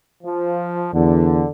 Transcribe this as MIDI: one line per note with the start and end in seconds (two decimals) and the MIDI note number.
0.24 0.89 53
0.94 1.44 40
0.94 1.49 50